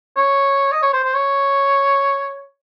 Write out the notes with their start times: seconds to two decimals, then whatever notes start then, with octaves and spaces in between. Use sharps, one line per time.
0.17 C#5
0.72 D#5
0.82 C#5
0.94 C5
1.04 C5
1.15 C#5